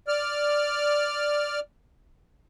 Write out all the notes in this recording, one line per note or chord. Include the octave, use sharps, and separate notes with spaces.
D5 F6